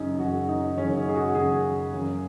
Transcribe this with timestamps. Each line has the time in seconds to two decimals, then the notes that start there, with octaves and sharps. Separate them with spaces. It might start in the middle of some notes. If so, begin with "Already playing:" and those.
Already playing: F#2 C#3 G#3 C#4 D#4
0.19 F#2 C#3 G#3 F#4
0.49 D#4
0.77 F#2 C#3 G#3 C#4
0.96 D#4
1.09 G#4
1.15 F#4
1.34 F#2 C#3 G#3 G#4
1.93 F#2 F#3